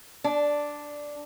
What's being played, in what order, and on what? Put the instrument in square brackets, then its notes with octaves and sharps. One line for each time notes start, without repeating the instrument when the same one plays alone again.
[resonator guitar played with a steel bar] D4